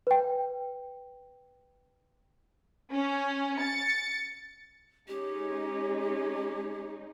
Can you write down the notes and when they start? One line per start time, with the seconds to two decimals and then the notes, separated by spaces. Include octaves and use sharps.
0.07 B4 G5
2.92 C#4
3.57 A6 C#7
5.08 G#3 C#4 D#4 G4